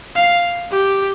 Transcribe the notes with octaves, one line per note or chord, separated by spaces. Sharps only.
F5
G4